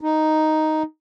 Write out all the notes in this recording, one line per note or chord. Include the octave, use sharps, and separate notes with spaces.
D#4